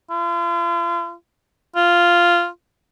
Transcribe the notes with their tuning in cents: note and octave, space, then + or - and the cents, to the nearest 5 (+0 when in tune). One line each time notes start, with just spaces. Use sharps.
F4 -40
F4 -5